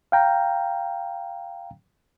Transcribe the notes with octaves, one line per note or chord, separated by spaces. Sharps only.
F5 G5 A#5